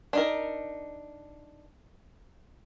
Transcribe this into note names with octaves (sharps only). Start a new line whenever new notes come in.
D4 D#4 A#4